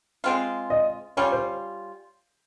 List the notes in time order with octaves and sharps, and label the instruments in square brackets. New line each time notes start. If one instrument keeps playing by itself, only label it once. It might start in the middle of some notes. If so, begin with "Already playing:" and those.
[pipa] G#3 C4 F4
[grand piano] D#5
[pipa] G3 C#4 F4 [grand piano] C#5
[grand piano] C5